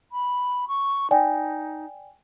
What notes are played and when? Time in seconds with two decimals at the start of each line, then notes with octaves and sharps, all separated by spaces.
0.12 B5
0.68 C#6
1.11 D#4 D5 G5 G#5